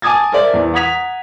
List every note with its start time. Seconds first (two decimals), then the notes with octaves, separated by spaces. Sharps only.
0.02 G#5 A5 D6 D#6 G#6 A6
0.32 A#4 C5 D5 E5
0.53 E2
0.74 F#5 A#5 D#6 G#6 B6 F7